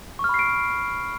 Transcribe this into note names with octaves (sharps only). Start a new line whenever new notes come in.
B5 C#6 F6 C7 D7